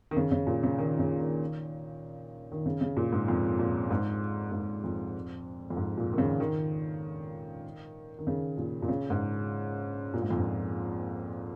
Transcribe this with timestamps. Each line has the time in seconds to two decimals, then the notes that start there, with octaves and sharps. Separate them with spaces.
0.11 D#3
0.17 C#3
0.32 C#3
0.47 A#2
0.63 C#3
0.78 D#3
0.99 C#3
1.20 D#3
2.52 D#3
2.66 C#3
2.81 C#3
2.97 A#2
3.12 G#2
3.28 F2
3.59 A#2
3.91 G#2
4.52 G#2
4.84 F2
5.70 F2
5.77 G#2
5.97 A#2
6.13 D#3
6.18 C#3
6.40 D#3
8.19 D#3
8.27 C#3
8.58 A#2
8.82 A#2
8.88 C#3
9.10 G#2
10.14 A#2
10.22 G#2
10.30 F2
10.38 G#2